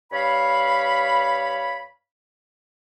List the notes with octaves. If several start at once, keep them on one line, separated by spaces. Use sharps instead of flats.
G2 C#5 F5 B5